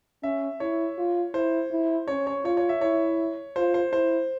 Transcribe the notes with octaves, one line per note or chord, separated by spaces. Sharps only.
C#4 E5
E4 C#5
F4
E4 C5
E4
C#4 C#5
C#5
F4 C#5
C#5
E5
E4 C#5
F4 C5
C5
E4 C5